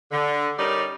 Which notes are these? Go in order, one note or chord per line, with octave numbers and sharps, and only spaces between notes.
D3
G3 C#4 D#4 A#4 D5